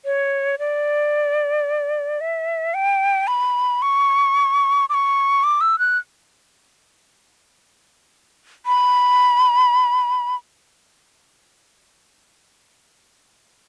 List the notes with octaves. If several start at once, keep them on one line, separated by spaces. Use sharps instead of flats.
C#5
D5
E5
G5
B5
C#6
D6
C#6
D6
E6
F#6
B5